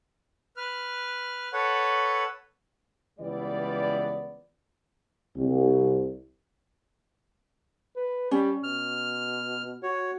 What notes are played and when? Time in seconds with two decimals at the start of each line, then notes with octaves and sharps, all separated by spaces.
0.57 B4 F6
1.53 A4 B4 C#5 F#5
3.20 C#2 E3 G3 B3 D5
5.36 C2
7.96 B4
8.31 G3 C#4
8.64 B2 F6
9.83 F#4 C#5